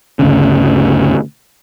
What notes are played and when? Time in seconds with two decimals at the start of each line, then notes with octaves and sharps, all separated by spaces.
0.19 G1 D2 C#3